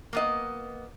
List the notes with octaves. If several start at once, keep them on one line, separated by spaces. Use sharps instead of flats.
A#3 B3 D#5